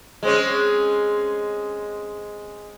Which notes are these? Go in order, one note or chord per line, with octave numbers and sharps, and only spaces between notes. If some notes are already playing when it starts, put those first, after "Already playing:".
G#3 C4 C#4